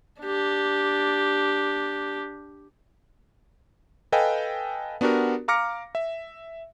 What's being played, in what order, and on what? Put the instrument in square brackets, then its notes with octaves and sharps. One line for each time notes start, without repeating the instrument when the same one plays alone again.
[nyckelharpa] D4 G4
[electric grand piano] A4 B4 D#5 F5 G5 G#5
B3 D4 F#4 G4 A#4
F5 A#5 D6 F6 A#6 C#7
E5